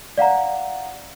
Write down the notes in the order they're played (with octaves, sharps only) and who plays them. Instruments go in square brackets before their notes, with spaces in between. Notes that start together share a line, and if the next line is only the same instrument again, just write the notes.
[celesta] D5 F5 F#5 A#5